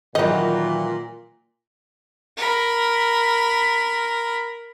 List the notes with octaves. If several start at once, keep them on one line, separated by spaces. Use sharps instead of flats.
A#2 D#3 E3 F#3 D#5
A#4 B5